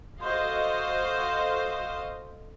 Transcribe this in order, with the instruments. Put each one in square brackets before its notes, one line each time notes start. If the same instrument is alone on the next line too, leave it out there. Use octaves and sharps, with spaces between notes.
[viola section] F#4 A4 C5 D#5 F5